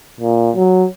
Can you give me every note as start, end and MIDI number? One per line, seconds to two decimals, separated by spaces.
0.20 0.51 46
0.56 0.86 54